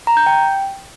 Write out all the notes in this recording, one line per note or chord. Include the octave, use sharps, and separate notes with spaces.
A#5
G6
G5